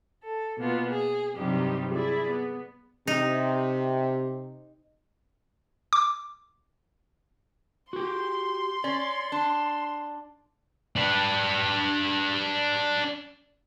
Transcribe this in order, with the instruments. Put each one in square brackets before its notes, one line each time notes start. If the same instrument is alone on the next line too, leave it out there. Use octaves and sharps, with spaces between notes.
[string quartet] A4
B2 A#3 B3 F4
G#4
G2 C3 F#3 G3 D#4 G4
E4 G#4 D5
B3
[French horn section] C3 [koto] D#4
[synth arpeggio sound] D6
[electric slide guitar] F#4 G4 [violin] C6
[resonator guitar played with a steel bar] C#4 [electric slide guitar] D5
[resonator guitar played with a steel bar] D4
[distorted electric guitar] D4 B4